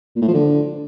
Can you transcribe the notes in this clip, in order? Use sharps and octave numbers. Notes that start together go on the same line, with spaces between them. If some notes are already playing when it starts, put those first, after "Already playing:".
A#2
A2
F3
D3